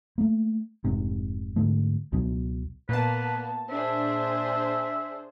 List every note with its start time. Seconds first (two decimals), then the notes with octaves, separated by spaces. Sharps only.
0.18 A3 A#3
0.85 F1 G#2 C3
1.56 G#2 D3 A3
2.12 C#2 B2 F#3
2.89 A#2 A#3 B3 B4 A5
3.71 D4 G#4 C5 E5